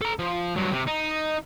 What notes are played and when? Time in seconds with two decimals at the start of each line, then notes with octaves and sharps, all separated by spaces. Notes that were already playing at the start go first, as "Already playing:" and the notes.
0.01 A4 A#5
0.19 F3
0.56 G2 F#3
0.72 C3
0.87 D#4